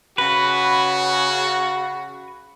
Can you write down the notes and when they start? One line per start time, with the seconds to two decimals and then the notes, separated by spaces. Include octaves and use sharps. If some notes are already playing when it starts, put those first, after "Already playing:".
0.18 C#3 F#4 B4